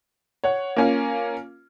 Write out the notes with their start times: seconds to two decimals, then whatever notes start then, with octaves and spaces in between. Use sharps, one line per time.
0.44 C#5 F#5
0.77 A#3 C#4 F4